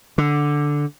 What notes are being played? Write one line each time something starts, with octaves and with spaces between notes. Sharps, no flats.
D3